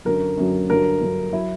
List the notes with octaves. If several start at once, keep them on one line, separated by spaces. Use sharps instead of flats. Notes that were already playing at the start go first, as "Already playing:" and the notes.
F#2 D3 F#3 A#4
F#2 D3 F#3
G2 D3 F#3 A#4
G2 D3 F#3
F#3 E4